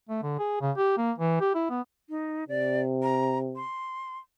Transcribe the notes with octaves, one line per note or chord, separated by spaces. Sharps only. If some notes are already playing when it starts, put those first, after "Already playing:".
A3
D3
G#4
C#3
G4
A#3
E3
G4
E4
B3
D#4
C3 D5
A#5
C6